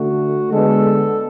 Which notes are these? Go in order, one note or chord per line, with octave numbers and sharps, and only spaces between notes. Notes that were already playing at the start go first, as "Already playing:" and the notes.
Already playing: D3 A3 F#4
D3 G#3 B3 A4